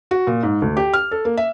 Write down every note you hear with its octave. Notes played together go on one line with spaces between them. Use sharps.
F#4
A#2
G#2
D2
G4
F6
A4
A#3
E5